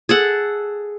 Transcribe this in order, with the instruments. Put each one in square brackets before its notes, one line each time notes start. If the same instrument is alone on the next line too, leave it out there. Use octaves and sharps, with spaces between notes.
[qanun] G#4 A4 F#5